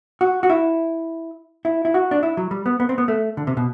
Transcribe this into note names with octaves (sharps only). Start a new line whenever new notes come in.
F#4
F#4
E4
E4
E4
F#4
D4
E4
F#3
G3
B3
B3
C4
B3
A3
D3
C3
B2